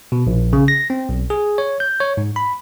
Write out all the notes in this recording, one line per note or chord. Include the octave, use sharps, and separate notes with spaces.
B2
A#1
C#3
A#6
C4
B1
G#4
C#5
G6
C#5
G#2
B5